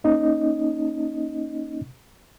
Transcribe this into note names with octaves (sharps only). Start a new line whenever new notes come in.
A#3 C#4 D#4 D#5